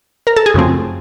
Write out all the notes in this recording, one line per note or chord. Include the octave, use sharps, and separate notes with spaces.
A#4 A#5
A4 A5
G#4 G#5
F#2 C#3 F3 A3 C4